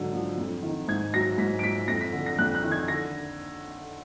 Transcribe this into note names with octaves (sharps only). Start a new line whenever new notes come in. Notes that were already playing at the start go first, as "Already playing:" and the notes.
Already playing: G#2 D3 F#3
F3
F2
D#3
G#2 G#6
F#3 A#6
G#2 B6
D7
F3 B6
F2 A#6
B6
D3
A#6
F2 F#6
F#6
D#3
G#6
D3 A#6